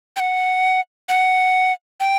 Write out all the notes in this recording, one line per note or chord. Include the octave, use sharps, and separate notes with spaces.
G5
F#5
F#5
G5